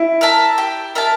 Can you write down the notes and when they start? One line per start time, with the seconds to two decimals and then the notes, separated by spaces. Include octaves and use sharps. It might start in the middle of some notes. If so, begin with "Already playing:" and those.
Already playing: E4
0.21 A#4 E5 A5
0.58 G4
0.95 A#4 E5 A5